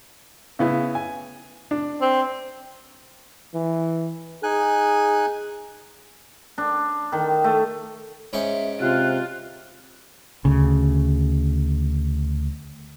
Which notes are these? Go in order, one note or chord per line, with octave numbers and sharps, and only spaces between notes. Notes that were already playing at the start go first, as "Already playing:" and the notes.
C#3 B3 E4
G#5
D4
C4
E3
D#4 G#4 G#5 F#6
D4
D#3
A3
G#2 C#4 E5 G5
C3 F4 F#6
D2 C#3